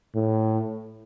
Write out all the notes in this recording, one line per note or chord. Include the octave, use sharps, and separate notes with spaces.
A2